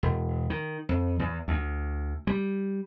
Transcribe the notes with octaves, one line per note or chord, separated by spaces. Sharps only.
E1
D#3
F2
E2
D2
G3